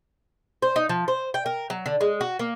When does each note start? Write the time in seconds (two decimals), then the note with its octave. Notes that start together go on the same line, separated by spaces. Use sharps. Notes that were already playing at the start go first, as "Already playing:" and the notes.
0.62 C5
0.76 D#4
0.89 F3
1.08 C5
1.34 G5
1.46 A#4
1.70 F#3
1.86 D3
2.01 G#3
2.21 F#4
2.39 A#3